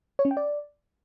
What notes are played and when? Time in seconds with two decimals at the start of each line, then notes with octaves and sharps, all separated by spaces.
0.19 C#5
0.25 C#4
0.31 G5
0.37 D5